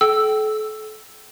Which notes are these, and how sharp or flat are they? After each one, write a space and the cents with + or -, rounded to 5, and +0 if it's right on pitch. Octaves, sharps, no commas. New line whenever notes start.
A4 -35 G5 -25 E6 +0